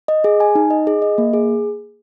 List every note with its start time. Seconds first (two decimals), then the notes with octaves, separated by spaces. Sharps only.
0.08 D#5
0.24 G#4
0.40 G#5
0.55 D#4
0.71 D#5
0.87 G#4
1.02 D#5
1.18 A#3
1.33 G#4